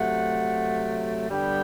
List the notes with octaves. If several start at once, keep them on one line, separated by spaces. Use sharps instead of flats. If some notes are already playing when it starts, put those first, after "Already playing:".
Already playing: C3 F#3 A3 F#5
G2 D3 G3 B3 G5